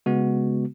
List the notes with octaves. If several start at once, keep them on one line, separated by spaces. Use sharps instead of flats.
C#3 G#3 B3 F#4